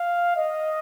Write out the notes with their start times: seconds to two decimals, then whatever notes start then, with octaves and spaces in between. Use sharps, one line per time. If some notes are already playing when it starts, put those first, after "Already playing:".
Already playing: F5
0.36 D#5